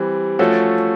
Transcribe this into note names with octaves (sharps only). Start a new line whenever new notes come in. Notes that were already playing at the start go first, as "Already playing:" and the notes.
Already playing: E3 G3 C4
F3 A3 C#4 F#4 A4